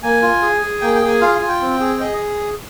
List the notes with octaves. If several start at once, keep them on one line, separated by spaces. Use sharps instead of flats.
A#3 G#5
F4
G#4
G#4
A#3 G5
G5
G#4
G#5
F4 F5
G#5
F4
G5
C4
G#4
G#4 D#5